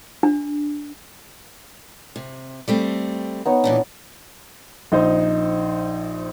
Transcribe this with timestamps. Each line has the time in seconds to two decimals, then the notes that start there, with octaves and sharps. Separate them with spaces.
0.23 D4
2.16 C3
2.68 G3 A3 C4
3.45 B3 D#4 C#5
3.64 A#2 E3 D4 E4
4.92 A#1 D#4 C5